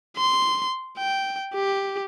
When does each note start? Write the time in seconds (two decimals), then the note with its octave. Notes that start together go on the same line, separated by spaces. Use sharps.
0.17 C6
0.98 G5
1.55 G4